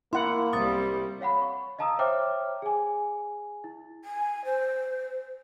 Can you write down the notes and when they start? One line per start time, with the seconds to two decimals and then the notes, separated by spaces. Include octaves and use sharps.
0.13 A#3 E4 F#5 C6
0.53 C2 G3 D#6 A6
1.21 C#5 F5 F#5 B5
1.42 C#6
1.79 D#5 F5 A5 A#5 D#6 E6
1.99 C5 C#5 E5 G5 D6 F6
2.62 G#4 G#5
3.64 E4
4.05 G#5
4.45 C5